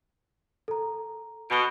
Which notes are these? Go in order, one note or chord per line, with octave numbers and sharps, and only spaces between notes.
A4 A#5
B2 D7 G7